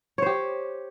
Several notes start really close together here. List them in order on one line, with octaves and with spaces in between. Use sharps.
C#5 C5 G4